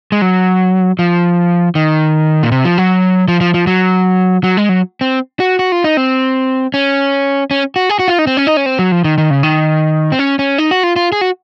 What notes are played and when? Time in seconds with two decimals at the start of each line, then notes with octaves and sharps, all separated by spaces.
0.12 G#3
0.22 F#3
0.99 F3
1.75 D#3
2.43 A#2
2.52 C3
2.65 F3
2.78 F#3
3.28 F3
3.41 F3
3.54 F3
3.67 F#3
4.44 F#3
4.57 G#3
4.69 F#3
5.01 C4
5.40 F#4
5.59 F#4
5.72 F4
5.84 D#4
5.97 C4
6.74 C#4
7.51 C#4
7.76 F#4
7.89 G#4
7.99 F#4
8.08 F4
8.19 D#4
8.27 C4
8.37 C#4
8.47 D#4
8.57 C#4
8.66 C4
8.79 F#3
8.92 F3
9.04 D#3
9.18 D#3
9.30 C#3
9.43 D#3
10.12 C4
10.19 C#4
10.39 C#4
10.58 D#4
10.71 F#4
10.83 F4
10.96 F4
11.12 G#4
11.21 F#4